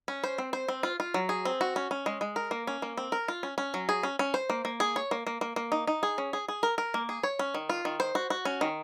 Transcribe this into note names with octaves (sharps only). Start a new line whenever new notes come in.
C#4
C5
C4
C5
C4
F4
F4
F#3
G#4
C4
F#4
C#4
C#4
G#3
G#3
A#4
A#3
C#4
A#3
C4
A#4
F4
C#4
C#4
F#3
G#4
C#4
C#4
C5
A#3
A#3
G#4
C#5
A#3
A#3
A#3
A#3
D#4
D#4
G#4
C#4
G#4
G#4
A#4
A#4
A#3
G#4
C#5
C#4
D#3
F4
D#3
C5
F#4
F#4
C#4
D#3